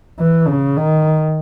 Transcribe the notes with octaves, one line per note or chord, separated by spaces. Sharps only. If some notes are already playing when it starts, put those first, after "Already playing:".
E3
C#3
D#3